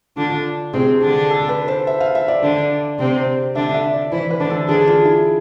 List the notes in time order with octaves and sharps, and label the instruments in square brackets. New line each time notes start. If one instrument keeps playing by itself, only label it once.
[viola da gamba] D3 D4 [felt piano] F4
[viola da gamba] C3 C4 [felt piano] G#4
[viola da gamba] D3 D4
[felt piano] A4
B4
C5
E5
F5
E5
D5
[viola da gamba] D3 D4
C3 C4
[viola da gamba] D3 D4 [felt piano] E5
[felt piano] E5
D5
[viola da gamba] E3 E4 [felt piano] C5
[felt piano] B4
[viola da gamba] D3 D4
[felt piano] A4
[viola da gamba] D3 D4 [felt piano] G#4
[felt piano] F4
E4